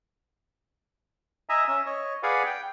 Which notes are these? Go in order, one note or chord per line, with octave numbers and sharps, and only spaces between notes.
D#5 E5 G#5 A#5
C#4 E5
C#5 D#5
G#4 B4 D5 F5 F#5 G#5
G5